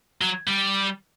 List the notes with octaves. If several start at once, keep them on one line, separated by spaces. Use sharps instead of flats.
F#3
G3